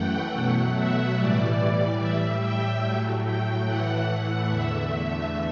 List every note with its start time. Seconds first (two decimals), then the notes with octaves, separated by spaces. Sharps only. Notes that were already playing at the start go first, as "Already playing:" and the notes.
Already playing: F#2 E3 A3 F#5 G5
0.34 B2 F#3 A3 F#5
0.76 E5
1.17 A2 E3 G3 D5
2.00 A2 G3 E5
2.42 G5
2.83 A2 F#3 A3
3.25 G5
3.66 A2 E3 A3 F#5
4.49 E2 D3 A3 E5